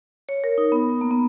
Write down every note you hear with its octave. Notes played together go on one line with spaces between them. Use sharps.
C#5
A#4
D#4
B3
A#3
B3